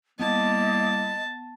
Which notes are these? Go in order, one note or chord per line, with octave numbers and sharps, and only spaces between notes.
G3 A#3 B3 E4 D#5 A5